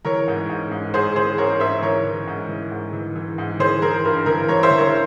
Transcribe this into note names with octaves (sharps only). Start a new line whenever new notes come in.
E3 A#4 C#5
G#2
G#2
G#2
G#2 G#4 C5
E3 G#4 C5
G#2 A#4 C#5
G#2 C5 E5
E3 A#4 C#5
E3
G#2
E3
G#2
E3
E3
G#2
E3 G#4 C5
E3 A#4
G2 A#4
E3 A#4
E3 A#4 C#5
C5 E5
E3
A#4 C#5